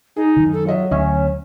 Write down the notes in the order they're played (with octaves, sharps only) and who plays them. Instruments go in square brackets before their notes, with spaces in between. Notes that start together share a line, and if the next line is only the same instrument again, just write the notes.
[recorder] D#4 [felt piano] G#4
[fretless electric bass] F#2 D#3
[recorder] A4
[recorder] F#3 [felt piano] F4 D#5 E5
[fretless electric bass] D2 [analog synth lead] C#4 [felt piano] D#5 E5